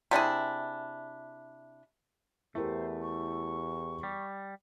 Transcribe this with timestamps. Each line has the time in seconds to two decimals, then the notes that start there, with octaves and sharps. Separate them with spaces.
0.11 C3 D4 E4 G#4
2.55 E2 A3 E4 G4 A#4 C5
3.02 C#6
4.03 G3